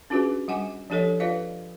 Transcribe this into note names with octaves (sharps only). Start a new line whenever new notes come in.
C#4 D4 F4 F#4 G#4 B4
G3 F#5 G#5 D6
F3 D4 G4 A4 C#5 D#5
F4 B4 D5 D#5 F5